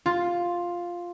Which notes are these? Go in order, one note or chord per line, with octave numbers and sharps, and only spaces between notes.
F4